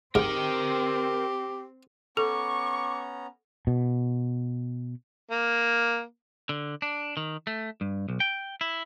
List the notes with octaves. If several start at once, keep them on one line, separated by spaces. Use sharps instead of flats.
G#2 C4 G4 A#4 G5
B3 C#4 A4 A#5 C#6 D6
B2
A#3
D3
D4
D#3
A3
G2
B1
G5
E4